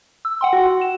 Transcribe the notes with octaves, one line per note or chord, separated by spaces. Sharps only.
E6
F#5 G5 C6
F#4
E7